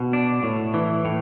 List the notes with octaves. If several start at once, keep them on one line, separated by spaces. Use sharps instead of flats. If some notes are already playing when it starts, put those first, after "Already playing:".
Already playing: B2
D4
A2
E3
A2